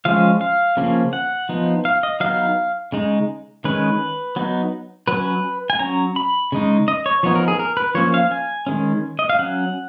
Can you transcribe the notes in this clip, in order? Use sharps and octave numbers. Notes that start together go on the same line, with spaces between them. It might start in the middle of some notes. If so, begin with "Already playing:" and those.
F3 G#3 C#4 F5
F5
C#3 F3 A#3 C#4
F#5
F3 B3 D#4
F5
D#5
F#3 B3 D#4 F5
C#3 G#3 D#4
D#3 G#3 C#4 B4
F#3 B3 D#4
F#3 C#4 B4
G#5
F#3 C#4 A#5
B5
C#3 G#3 D#4
D#5
C#5
F3 B3 D#4 C#5
A#4
G#4
A#4
B4
F3 A#3 C#4 C#5
F5
G#5
D#3 G#3 C#4
D#5
F5
F#3 C#4 F#5